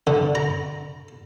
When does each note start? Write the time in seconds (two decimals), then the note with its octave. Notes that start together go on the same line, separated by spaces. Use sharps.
0.07 D3
0.35 A#5